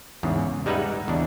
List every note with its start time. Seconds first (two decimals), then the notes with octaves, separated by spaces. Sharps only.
0.23 E2 G#2 C#3
0.66 G3 G#3 D#4 B4 E5 F#5
1.08 E2 C#3 D4